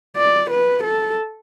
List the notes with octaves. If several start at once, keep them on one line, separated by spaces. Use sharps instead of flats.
D5
B4
A4